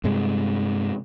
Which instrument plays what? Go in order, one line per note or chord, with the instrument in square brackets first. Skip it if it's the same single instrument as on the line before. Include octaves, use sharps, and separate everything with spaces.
[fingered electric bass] G2 C3 G#3